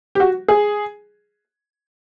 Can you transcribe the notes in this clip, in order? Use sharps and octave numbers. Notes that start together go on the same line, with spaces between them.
G4
F#4
G#4